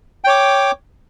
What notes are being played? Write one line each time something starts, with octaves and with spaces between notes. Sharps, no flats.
C#5 G5 D6